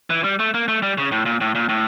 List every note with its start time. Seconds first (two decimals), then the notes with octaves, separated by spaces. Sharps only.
0.10 E3
0.24 G3
0.39 A3
0.54 A#3
0.68 A3
0.82 G3
0.98 C#3
1.12 A2
1.26 A#2
1.41 A2
1.55 A#2
1.69 A2